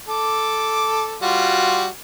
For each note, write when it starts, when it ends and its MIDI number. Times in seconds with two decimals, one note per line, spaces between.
0.09 1.16 69
0.09 1.16 86
1.22 1.87 55
1.22 1.87 65
1.22 1.87 66